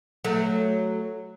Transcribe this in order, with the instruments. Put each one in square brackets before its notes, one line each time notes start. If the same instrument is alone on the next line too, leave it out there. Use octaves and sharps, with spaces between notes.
[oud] F#3 A3